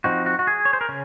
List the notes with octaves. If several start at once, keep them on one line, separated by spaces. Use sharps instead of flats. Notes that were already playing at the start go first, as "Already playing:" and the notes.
F3 C4 D#4 F#4
F#4
F#4
G#4
C#5
C5
A#4
C#3 C#4